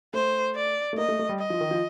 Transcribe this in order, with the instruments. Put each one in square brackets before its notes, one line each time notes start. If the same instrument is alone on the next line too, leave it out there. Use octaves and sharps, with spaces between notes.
[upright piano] A3 [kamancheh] C5
[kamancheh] D5
[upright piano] A3
[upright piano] A#3 [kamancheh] D#5
[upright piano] A3
A3
G3
[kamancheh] D#5
[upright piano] F3
D#3
F3